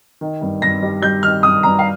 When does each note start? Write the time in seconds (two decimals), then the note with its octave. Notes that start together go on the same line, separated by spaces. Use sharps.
0.21 D#3
0.41 G2
0.62 G2 A#6
0.82 G3
1.02 G3 G6
1.23 D#3 F6
1.43 G2 D#6
1.63 G2 A#5
1.79 F5